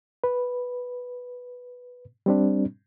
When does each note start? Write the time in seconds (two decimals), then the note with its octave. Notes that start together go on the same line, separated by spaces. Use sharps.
0.24 B4
2.26 G3 C4 D4